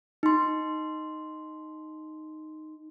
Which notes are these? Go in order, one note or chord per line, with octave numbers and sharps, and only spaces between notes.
D#4 C6